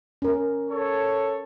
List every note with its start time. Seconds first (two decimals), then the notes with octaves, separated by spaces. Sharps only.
0.22 C#4 A#4
0.71 A4 C#5